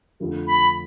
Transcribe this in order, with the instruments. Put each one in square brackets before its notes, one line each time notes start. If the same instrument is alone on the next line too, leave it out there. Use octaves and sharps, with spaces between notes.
[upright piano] F2 D3 F3 A3
[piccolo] B5